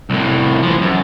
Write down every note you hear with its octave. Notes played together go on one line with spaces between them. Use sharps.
C2 A2
E3 F3
F#2